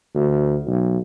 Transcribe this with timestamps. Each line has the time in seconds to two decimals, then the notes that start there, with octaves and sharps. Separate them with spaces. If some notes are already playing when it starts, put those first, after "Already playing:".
0.15 D2
0.67 B1